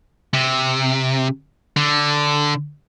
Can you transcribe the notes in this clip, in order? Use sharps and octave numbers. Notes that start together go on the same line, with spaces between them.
C3
D3